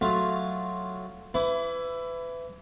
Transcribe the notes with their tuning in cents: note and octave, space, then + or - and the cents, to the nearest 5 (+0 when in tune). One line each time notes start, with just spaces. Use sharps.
F#3 +0 A3 +0 F4 +0
E4 +15 B4 +30 D6 -30